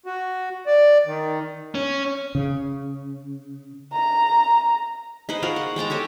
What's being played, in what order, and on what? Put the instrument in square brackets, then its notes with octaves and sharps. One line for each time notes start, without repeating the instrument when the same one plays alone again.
[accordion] F#4
D5
D#3
[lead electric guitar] C#4
[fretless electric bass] C#3
[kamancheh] A#5
[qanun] D#4 G#4 B4 C5
F4 F#4 G#4 A#4
F#5
G#3 G5 A5 A#5
G4 A4 C#5 G#5